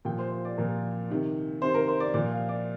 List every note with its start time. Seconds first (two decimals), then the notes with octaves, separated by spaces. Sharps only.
0.05 A#2 G5
0.08 F3
0.19 C5
0.31 C5
0.45 D5
0.58 A#2 F3 A#4
1.10 C3 D#3
1.61 C3 D#3 C5
1.74 A#4
1.88 C5
2.00 D5
2.14 A#2 F3 D5
2.32 F5
2.49 D5